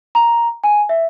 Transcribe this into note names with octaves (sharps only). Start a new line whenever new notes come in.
A#5
G#5
E5